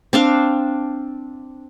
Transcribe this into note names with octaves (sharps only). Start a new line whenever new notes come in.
C4 D4 F5